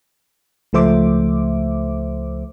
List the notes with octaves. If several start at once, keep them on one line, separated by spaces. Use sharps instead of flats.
C#2 F3 A3 C5 E5 D6